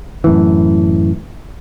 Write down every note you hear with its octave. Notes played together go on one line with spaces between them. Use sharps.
F#2 A2 E3